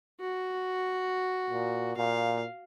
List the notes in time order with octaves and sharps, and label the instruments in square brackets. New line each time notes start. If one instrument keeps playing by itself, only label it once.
[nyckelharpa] F#4
[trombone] A#2
[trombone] A#2 [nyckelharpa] F5